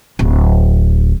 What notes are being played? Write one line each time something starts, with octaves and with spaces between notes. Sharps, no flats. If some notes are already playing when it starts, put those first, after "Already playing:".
D1